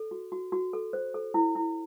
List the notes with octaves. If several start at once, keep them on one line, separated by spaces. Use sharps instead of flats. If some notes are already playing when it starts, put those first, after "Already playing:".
Already playing: A4
F#4
F#4
F#4
A4
C5
A4
E4
E4